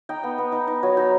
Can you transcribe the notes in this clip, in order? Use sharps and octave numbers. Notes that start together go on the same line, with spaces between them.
D#4 G5
B3
B3
D#4
D#4
F#3
D#4